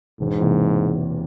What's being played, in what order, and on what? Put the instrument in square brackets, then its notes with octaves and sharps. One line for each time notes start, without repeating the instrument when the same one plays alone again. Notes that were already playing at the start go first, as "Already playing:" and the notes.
[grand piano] E1 [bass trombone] G#2
[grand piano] E2 C3 E3 A#3